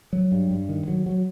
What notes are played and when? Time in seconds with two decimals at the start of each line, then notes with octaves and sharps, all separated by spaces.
0.13 F#3
0.32 G2
0.51 G2
0.69 D#3
0.88 F#3
1.06 F#3